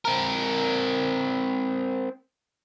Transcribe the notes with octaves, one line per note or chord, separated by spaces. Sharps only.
C4 A#4